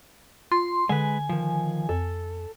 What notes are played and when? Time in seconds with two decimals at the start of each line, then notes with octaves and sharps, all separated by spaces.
0.52 F4 C6
0.89 D3 G#3 B4 G#5
1.29 D#3 F3
1.89 F2 A4